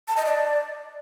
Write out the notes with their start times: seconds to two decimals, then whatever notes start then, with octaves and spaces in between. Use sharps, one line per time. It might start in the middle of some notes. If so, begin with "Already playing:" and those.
0.08 A5
0.17 D#5
0.25 D5